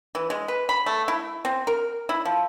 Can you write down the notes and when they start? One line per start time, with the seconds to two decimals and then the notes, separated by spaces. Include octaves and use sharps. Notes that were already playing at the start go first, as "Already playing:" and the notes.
0.15 E3
0.30 G#3
0.48 B4
0.69 B5
0.86 A3
1.08 E4
1.45 C4
1.67 A#4
2.09 E4
2.25 F3